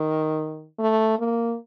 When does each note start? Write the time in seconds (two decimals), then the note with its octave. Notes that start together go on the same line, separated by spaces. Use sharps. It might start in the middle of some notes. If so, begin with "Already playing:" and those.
Already playing: D#3
0.79 A3
1.19 A#3